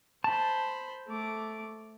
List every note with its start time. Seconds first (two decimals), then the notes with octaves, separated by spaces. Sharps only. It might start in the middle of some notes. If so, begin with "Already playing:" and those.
0.24 C5 A5 B5
1.08 A3 D6